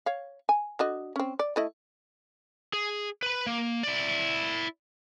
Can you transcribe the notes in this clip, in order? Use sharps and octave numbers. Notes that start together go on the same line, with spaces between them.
C#5 F5
G#5
D3 F#4 D#5
C4 C#4
D5
A3 E4 D#5
G#4
B4 B5
A#3
E4 D5